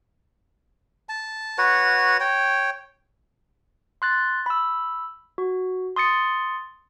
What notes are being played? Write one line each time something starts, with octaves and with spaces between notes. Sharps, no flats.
A5
F#4 B4 C#5 F#5
C#5 G5
C6 F#6 A6
B5 E6
F#4
C6 D#6 A6 C#7